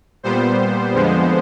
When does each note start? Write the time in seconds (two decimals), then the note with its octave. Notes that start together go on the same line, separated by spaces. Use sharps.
0.23 A#2 G3 B3 C5
0.93 F2 D3 F3 G#3 B3